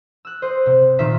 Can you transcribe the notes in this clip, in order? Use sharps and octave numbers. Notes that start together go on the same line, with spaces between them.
E6 F#6
C5 D#5
C3
A#2 D#3 D#4 F4 E5 B6